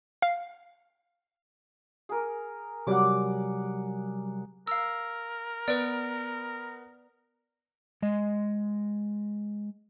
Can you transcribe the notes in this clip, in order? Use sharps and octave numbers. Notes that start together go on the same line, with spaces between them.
F5
G#4 A#4
C3 F#3 G3 F#5 D6
A#4 F5 E6
B3 B4 D5 D7
G#3 D#5